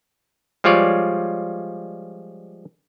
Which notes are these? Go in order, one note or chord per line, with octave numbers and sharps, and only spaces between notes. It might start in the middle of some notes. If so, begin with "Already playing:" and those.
F3 G3 G#3 F4 C#5 D5